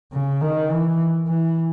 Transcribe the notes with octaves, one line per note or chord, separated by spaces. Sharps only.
C#3
D#3
E3
E3